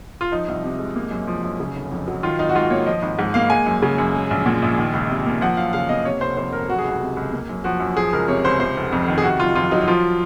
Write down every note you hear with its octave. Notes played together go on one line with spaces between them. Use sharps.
F4
F3 D#4
C2
C3
G#3
A#3
F#2
F3
F#2
C#3
F1
F2
F#3
D#3 F4
G#1 D#4
F#4
G#2 F4
A#3 C#5
F3 D#5
G#1
G#2
A#3 F5
G#3 G#5
F#2
C#3
F#2
G#3
A#1
A#2
A#1
D#3
C#2
C3
A#3
F3 F#5
F#2 F5
C#3 F5
A#3 D#5
C3 C#5
F1 C5
F2 C5
F1 A#4
F#3 F#4
G#4
C#2 F#4
C3
C#2
A#3
F#2
F3 F#4
F#2
F3 G#4
C#2 A#4
C3 C#5
C#2 C5
C3 C5
F1
F2
D#3
G#4
C3 F#4
F#1 F4
F2 F4
F#3 D#4
D#4
F3 F4